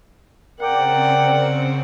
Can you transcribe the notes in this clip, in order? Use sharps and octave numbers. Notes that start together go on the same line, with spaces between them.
C#3 C4 A#4 D5 F#5 G5